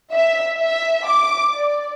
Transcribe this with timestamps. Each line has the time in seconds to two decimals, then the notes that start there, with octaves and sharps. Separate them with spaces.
0.13 E5
0.58 E5
1.07 D6
1.55 D5